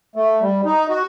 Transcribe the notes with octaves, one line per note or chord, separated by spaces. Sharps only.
A3
G3
D#4
F#4